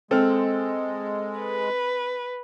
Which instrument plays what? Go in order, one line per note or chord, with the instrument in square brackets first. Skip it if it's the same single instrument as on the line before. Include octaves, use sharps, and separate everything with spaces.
[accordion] G#3 [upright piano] C4 [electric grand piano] A4 F6
[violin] B4